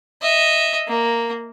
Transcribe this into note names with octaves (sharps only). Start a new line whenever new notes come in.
D#5 E5
A#3